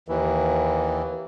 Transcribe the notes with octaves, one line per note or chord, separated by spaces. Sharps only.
D#2 E3